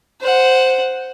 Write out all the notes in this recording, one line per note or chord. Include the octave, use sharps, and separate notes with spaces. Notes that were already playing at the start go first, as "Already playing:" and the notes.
C5 F#5